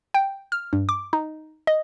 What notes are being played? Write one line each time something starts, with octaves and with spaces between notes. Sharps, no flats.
G5
F6
G2
D6
D#4
D#5